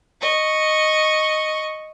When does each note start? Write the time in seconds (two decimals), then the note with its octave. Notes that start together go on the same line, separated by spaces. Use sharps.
0.21 D#5 C#6